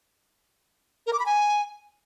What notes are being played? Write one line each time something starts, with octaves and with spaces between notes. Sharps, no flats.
A#4
D6
B5
G#5